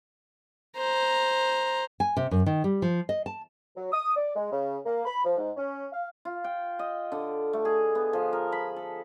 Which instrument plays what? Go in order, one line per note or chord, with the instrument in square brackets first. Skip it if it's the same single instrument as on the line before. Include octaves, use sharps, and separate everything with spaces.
[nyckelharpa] C5 A#5
[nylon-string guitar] G#5
C3
F#2
D#3
G3
F3
D#5
A5
[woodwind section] F#3
D#6
D5
G#3
C#3
A#3
B5
F3
G#2
C#4
F5
[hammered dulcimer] F4
G5
D#5
D3
A3
G#4
B3
F3
A#4
B5
A4